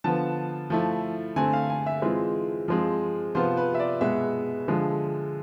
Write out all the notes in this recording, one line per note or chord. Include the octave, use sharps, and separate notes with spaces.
D3 F3 B3 A5
F3 A3 E4
D3 A3 C4 G#5
F5
G#5
E5
E3 G#3 C4 F4
F3 G#3 C4
C3 F3 B3 F4 C5
B4
E5
D5
B2 G#3 B3 E5
D3 F3 G#3